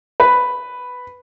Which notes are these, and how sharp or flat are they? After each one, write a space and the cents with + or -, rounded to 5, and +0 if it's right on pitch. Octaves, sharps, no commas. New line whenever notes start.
B4 +5